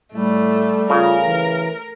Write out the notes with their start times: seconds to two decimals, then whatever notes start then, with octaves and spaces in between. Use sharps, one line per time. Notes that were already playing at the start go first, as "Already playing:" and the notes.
0.13 A2 G3 A3
0.90 C#3 F4 A#4
1.25 E3